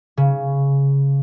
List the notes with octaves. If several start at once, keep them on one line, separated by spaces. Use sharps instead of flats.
C#3